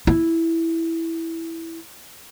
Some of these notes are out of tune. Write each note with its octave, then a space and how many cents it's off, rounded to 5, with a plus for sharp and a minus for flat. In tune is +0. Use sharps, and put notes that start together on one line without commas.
E4 +0